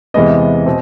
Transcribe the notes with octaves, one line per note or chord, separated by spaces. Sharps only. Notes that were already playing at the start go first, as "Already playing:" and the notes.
E2 C3 E3 G#3 B3 D#5
B2 C4